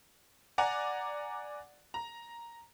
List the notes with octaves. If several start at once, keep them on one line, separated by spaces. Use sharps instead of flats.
D5 F#5 G#5 A#5
A#5